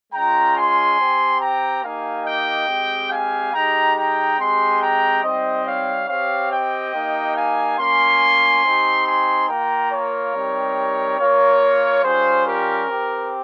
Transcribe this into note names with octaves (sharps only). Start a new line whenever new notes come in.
G#3 C#4 F4 G5 A#5
G#5 C6
C4 G4
G5 A#5
A#3 D#4 G4 F5 G#5
D#5 G5
G#3 C4 G4
F5 G#5
G#3 D#4 G4 G5 A#5
G5 A#5
G#3 C4 G4 G#5 C6
G5 A#5
G3 C4 D#4 C5 D#5
C#5 F5
C4 G4 C#5 F5
D#5 G5
A#3 D#4 G4
F5 G#5
A#3 C#4 F4 G#5 C6
C4 D#4 G4
G#5 C6
A#3 F4 G5 A#5
A#4 C#5
G3 C4 D#4 G4
A#3 F4 A#4 C#5
G3 C#4 F4 G#4 C5
G4 A#4
C4 G4